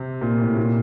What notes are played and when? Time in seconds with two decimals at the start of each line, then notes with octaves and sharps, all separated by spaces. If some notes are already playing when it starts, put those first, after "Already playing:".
Already playing: C3
0.21 A#2
0.40 A2
0.57 A#2